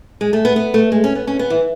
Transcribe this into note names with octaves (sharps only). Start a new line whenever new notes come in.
G#3
A3
B3
B3
A3
G#3
C#4
B3
C#4
B3
E3